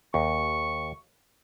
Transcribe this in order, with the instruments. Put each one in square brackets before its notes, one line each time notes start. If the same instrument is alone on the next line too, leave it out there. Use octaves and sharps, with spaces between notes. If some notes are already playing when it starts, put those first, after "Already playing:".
[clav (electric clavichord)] D#2 [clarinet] C#6